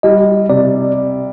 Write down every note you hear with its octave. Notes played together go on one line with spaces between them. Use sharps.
G3 D#5
C3 D5